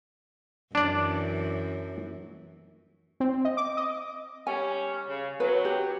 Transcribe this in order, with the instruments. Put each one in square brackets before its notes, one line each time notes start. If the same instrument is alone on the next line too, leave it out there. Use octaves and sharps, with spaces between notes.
[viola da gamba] F#2 E3 [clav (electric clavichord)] D4 D5
[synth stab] C4
D#5
D6
D#5
[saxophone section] G3 C#4 [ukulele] G#5
[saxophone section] C#3
[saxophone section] F#3 [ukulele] B4
[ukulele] G4